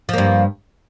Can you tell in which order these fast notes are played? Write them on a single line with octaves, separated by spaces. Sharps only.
F3 A#3 G2